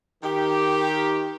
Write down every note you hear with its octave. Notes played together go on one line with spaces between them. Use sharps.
D#3 G4